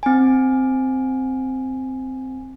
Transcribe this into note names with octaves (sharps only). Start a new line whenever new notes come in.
C4 G#5